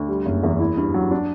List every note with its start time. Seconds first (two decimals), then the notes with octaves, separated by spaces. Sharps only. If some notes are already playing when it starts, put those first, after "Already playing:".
Already playing: D2
0.08 G3
0.26 F#1
0.43 E2
0.60 E4
0.77 G2
0.94 F#3
1.11 D4